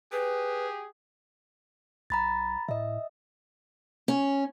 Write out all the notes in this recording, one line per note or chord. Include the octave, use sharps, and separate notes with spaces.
G4 G#4 B4
B1 A#5 B5 A6
A2 D#5 E5
C#4